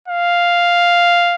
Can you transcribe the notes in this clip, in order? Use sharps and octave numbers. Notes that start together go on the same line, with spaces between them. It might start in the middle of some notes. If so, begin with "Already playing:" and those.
F5